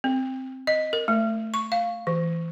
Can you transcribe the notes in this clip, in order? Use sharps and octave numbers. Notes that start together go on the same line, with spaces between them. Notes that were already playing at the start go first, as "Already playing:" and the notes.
C4
D#5
A#4
A3
C#6
F5
E3